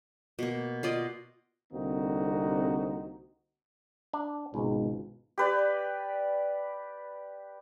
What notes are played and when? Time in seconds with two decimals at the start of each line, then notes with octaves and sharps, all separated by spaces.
0.39 B2 A#3
0.83 F4 D5 D#5
1.73 C2 D3 A#3 C4 D#4 F#4
4.13 D4
4.54 G#1 C#2 G#2 B2
5.38 G4 B4 D5